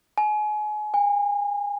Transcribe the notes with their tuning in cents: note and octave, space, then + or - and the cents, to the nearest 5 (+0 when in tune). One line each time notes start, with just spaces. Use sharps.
G#5 +30
G#5 -35